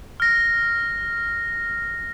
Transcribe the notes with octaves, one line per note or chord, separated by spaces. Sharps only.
F6 A#6